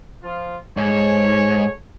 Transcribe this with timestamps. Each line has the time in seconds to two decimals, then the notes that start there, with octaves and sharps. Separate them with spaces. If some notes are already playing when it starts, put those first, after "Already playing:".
0.23 F3 F4
0.77 G#2 G#4 A4 C#5